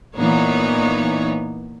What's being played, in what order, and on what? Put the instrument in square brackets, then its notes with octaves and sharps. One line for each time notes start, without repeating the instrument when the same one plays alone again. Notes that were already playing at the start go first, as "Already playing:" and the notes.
[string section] A#2 E3 B3 D#4 C#5